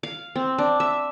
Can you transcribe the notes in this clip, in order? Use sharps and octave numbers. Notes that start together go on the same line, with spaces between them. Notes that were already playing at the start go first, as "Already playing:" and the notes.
F5
C4
D4
E5